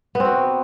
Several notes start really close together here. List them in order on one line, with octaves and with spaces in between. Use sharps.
B3 C4 F#4